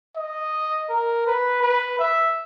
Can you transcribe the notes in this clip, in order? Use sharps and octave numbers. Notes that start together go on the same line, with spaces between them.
D#5
A#4
B4
B4
E5